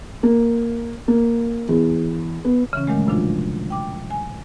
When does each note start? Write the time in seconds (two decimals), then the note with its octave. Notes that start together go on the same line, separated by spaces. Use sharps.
0.23 A#3
1.08 A#3
1.69 E2
2.45 B3
2.73 C#3 E3 C#4
2.87 A#2 D#3 F#3 G#3 A3
3.06 F#2 A2 C3 F3 D4 F4
3.70 G5 D6
4.11 G#5